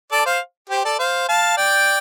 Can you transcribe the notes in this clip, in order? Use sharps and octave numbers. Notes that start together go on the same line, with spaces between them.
A4 D5
C5 F5
G4 C5
A4 D5
C5 F5
F5 A5
D5 G5